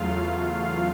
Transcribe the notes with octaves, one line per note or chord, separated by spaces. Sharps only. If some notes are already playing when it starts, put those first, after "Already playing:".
Already playing: E2 C#3 F#3 A3 F4 F5